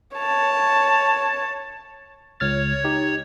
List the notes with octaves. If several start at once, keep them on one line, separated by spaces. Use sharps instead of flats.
C#5 A5
C#2 C#5 F6 A6
D#4 G4